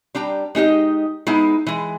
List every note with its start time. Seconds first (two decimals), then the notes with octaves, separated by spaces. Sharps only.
0.15 G3 D4 G5 A#5
0.55 G#3 D#4 G4 D#5
1.27 G#3 B3 D#4 E4
1.67 E3 G#3